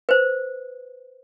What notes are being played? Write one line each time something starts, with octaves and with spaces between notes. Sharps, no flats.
B4 C5